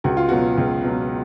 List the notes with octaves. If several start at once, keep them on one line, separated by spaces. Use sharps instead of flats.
C#2 F#4
F4
B2 F#3 F#4
C#2
B2 F#3